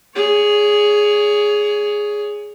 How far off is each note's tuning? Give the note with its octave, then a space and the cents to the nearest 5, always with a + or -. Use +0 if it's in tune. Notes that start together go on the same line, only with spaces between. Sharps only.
G#4 +0 C#5 +25